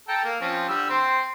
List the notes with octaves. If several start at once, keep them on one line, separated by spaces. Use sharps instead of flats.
A4 G5 A#5
A#3
F3 C4 C#4
D3 G3 E6
C4 C6